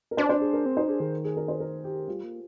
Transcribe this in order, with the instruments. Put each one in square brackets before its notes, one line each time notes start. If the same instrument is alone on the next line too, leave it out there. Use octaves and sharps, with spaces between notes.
[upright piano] A#4
[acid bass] D4 [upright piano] C5
[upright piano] C5
G#4
A#4
[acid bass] C4
[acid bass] D#4 [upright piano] C5
[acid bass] D4 [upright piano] G#4
[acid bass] D#3 [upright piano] G#4
[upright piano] G#4
A#4
C5
A#4
G4
[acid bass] G3 [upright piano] F4
[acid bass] A#3